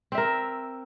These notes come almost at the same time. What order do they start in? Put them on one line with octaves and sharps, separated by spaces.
C4 E5 A#4